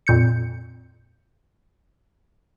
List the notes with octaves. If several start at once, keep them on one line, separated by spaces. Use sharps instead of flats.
F2 A#2 G6 C#7